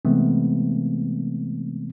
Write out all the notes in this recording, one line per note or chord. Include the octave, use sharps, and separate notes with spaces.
C3 E3 G#3 A3 B3 C4